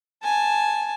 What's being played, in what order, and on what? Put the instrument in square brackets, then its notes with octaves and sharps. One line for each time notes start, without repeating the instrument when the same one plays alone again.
[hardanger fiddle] G#5 A5